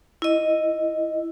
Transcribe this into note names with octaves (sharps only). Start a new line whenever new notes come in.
E4 D#5